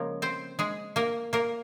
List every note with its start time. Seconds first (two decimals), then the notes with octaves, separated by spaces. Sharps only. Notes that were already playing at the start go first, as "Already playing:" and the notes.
Already playing: C#3 F3 G#3 A#3 A#4
0.22 C4 C5
0.59 G#3 G#4
0.96 A#3 A#4
1.33 A#3 A#4